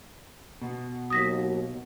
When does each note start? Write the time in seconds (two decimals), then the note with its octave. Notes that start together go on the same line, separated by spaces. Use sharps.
0.62 B2
1.10 D#2 F#3 D#6 A#6 B6